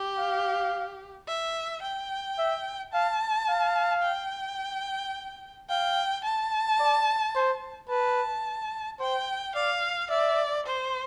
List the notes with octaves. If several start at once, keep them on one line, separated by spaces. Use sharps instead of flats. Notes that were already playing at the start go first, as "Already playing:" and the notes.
Already playing: G4
F5
E5
G5
E5
F5 A5
F5
G5
F5 G5
A5
D5
C5
B4 A5
C5 G5
D5 F5
D5 E5
C5